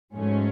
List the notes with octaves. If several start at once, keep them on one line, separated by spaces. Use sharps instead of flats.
G#2 F#3 A3 C#4